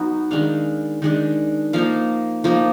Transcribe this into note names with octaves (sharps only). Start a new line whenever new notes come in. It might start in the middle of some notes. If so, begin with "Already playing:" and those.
Already playing: F#3 B3 D#4
D#3 G#3 D4 F5
D#3 G#3 D4
F3 A#3 D#4 F5
F3 A#3 D#4